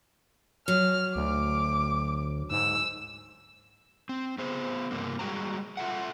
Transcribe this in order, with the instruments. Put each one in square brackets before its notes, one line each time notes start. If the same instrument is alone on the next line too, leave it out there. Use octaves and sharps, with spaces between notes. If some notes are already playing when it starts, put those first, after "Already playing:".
[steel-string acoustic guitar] F#3 [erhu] F6
[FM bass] D2 [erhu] D6
[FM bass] G#2 [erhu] E6
[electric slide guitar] C4
B3 G#4 C5
G2 C3 A#3 C4
G3 G#3 B3 F#4 G5 A#5
F4 A4 E5 F#5